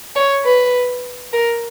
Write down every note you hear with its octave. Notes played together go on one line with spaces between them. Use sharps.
C#5
B4
A#4